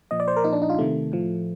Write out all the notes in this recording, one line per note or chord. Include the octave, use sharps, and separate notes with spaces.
A#2 F3 D#5
D5
C5
A#4
A#2 F3 D#4
D4
D#4
F4
C3 D#3 A3
A2 F3